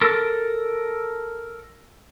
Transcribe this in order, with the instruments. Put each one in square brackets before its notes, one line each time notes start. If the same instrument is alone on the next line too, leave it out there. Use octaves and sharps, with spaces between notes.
[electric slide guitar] A4 A#4